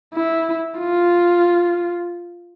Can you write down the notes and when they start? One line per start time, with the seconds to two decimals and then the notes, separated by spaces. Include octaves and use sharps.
0.14 E4
0.79 F4